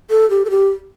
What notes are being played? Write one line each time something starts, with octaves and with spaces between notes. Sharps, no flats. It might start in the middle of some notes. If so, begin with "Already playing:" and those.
A4
G4
A4
G4